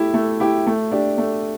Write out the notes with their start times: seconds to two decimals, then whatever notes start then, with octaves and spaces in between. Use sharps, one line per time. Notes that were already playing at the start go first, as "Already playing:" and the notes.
Already playing: A3 E4 G4
0.14 A3
0.40 E4 G4
0.67 A3
0.91 D4 G4
1.18 A3